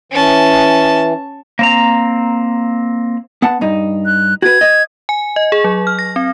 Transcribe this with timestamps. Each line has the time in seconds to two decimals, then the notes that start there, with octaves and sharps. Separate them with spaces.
0.12 E3 C#4 A5
1.59 A#3 C4 A#5
3.42 B3 F#5 A5
3.61 G2 D#4
4.06 F#6
4.42 F#4 B4 G#6
4.61 D#5
5.09 G#5
5.36 D#5
5.52 G#4
5.64 F#3
5.87 F6
5.99 A#6
6.16 C4